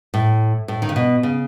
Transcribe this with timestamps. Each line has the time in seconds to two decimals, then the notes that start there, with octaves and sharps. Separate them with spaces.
0.14 A2
0.68 A2
0.82 D#3
0.89 C#3
0.96 B2
1.23 C#3